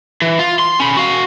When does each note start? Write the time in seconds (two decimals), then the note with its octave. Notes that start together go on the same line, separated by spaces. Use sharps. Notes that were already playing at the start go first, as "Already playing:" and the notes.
0.22 E3
0.39 F4
0.59 C6
0.80 C#4 B5
0.97 F#4 F5